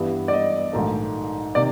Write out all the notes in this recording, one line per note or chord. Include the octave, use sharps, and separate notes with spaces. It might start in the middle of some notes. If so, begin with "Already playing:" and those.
Already playing: G2 E3 G3 B3
D5
D#5
A#1 G#2 D#3 F#3 A3
C3 D#3 D5